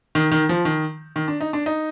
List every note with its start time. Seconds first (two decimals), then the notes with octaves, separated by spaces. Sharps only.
0.15 D#3
0.31 D#3
0.49 F3
0.65 D#3
1.16 D#3
1.28 D4
1.41 D#4
1.53 D4
1.66 D#4